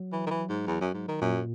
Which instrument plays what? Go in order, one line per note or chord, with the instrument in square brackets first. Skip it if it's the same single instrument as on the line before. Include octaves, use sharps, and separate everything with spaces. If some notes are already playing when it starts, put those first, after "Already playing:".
Already playing: [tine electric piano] F#3
[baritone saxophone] E3
D#3
E3
G#2
E2
F#2
G#2
D#3
[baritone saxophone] F#2 [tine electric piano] A#2